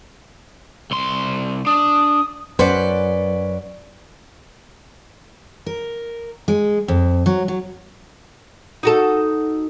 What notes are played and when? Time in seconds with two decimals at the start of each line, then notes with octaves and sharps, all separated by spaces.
0.91 C2 C6
1.67 D4 D#6
2.59 F#2 C#4 B4 C5 D5 F#5
5.66 A#4
6.48 G#3
6.88 F2
7.26 F#3
7.48 F#3
8.83 D#4 F#4 A4